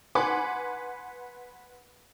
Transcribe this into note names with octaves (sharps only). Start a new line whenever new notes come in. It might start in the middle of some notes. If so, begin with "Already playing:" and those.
B4 F#5 G#5 C6 D6